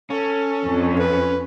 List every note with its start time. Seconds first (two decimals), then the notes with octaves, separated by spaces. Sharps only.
0.10 C#4 A4
0.64 F2
0.99 B4